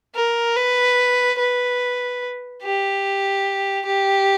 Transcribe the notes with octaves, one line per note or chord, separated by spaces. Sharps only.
A#4
B4
B4
G4
G4